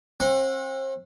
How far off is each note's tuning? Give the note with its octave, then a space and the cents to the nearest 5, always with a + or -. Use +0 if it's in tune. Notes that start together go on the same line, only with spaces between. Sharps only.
C4 +40 F#5 -25 C6 +0